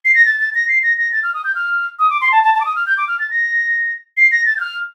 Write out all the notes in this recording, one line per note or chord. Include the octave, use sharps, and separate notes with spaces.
C7
A#6
A6
A6
A#6
C7
A#6
A#6
A6
F6
D#6
G6
F6
D#6
D6
C6
A5
A5
A5
D6
D#6
F6
G6
D6
F6
A6
A#6
C7
A#6
A6
G6
F6